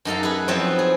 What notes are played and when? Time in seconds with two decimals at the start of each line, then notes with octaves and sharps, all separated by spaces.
0.05 F#2 D#4 A4 F5
0.23 G#4 B4
0.48 F3 F#3 B3 C4 E4 E5
0.79 G#4